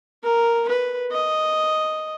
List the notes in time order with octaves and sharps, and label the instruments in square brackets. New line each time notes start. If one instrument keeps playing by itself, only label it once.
[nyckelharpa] A#4
B4
D#5